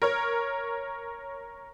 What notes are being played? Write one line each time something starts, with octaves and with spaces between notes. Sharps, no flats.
A#4 C#5